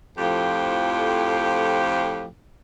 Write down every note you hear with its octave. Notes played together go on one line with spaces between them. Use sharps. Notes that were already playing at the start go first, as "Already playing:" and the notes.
F2 A2 F3 G4